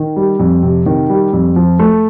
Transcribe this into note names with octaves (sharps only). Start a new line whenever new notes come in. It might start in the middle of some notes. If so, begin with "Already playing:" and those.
Already playing: D#3
G3
F2
C3
D#3
G3
F2
F3
A3